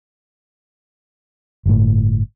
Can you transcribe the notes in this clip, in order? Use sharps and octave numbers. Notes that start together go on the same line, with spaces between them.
G1 A2